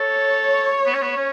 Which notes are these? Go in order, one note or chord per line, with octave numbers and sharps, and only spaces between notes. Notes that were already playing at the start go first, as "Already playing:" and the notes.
Already playing: A4 C#5
B3
C#4
B3
C#4